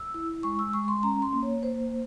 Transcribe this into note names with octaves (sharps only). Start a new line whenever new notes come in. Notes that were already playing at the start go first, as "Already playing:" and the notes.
Already playing: E6
E4
G#3 C#6
E6
G#3 C#6
C6
C#4 A#5
C6
A#3
C#5
A#3 C5